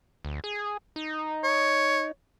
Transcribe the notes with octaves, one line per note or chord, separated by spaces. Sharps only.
D2
G#4
D#4
C#5